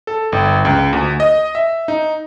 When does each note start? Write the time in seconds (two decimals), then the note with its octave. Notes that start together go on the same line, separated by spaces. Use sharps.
0.07 A4
0.32 G1
0.65 C#2
0.93 D2
1.20 D#5
1.55 E5
1.88 D#4